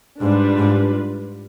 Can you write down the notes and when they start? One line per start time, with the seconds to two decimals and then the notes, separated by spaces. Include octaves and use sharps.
0.20 G#2 G3 D4 F4 B4
0.58 G#2